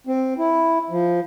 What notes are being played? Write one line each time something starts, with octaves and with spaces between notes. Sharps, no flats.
C4
E4
F3